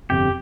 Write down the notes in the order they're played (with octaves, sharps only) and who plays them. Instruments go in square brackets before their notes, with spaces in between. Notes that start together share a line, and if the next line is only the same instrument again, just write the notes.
[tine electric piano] G1 F2 C3 [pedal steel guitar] G4